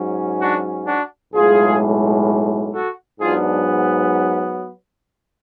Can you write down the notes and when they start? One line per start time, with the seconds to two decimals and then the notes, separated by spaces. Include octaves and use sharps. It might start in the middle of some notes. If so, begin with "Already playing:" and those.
Already playing: G#2 F#3 C#4
0.41 D4 F#4
0.87 D4 F#4
1.34 B1 A2 G#3 F4 G#4
2.74 F#4 A4
3.20 G#2 F#3 B3 D4 F4 G#4